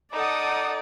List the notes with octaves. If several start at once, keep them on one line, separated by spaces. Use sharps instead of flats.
D#4 A4 D5 F#5 D#6